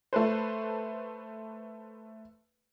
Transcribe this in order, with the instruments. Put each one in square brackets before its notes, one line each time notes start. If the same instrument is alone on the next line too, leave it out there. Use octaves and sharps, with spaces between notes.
[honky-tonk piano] A3 A4 B4 C5